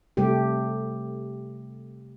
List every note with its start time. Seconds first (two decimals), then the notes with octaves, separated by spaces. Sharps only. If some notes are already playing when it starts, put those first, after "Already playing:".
0.17 C3 G3 A3 G4